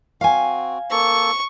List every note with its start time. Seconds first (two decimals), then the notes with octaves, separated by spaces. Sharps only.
0.21 C4 F#4 F5 G#5
0.91 A#3 A4 C#6